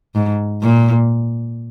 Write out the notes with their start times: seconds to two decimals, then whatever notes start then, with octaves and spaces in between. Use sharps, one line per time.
0.15 G#2
0.63 A#2